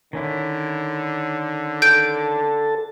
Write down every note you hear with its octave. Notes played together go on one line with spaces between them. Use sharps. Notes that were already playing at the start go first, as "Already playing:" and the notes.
D3 D#3 C#4 E4
A4 A5 G6 D7